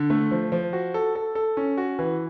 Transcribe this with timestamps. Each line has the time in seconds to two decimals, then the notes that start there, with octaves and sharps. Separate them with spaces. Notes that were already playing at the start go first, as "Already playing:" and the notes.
Already playing: D3
0.10 A3
0.31 F3
0.52 F3
0.73 F#4
0.94 A4
1.15 A4
1.35 A4
1.57 C#4
1.78 F#4
1.99 E3